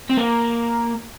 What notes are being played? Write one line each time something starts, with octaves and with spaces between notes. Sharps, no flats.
C4
A#3